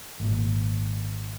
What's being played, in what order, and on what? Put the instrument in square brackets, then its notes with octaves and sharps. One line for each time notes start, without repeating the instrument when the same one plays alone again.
[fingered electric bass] G#1 A#2